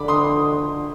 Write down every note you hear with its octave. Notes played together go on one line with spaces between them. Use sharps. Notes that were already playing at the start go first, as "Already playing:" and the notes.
Already playing: D3 B5 D6
C6 D#6